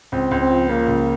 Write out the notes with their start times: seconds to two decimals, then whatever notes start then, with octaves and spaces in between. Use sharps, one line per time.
0.12 C#2 C4
0.31 C#2
0.41 C4
0.50 F3
0.69 C#3 A#3
0.88 C#2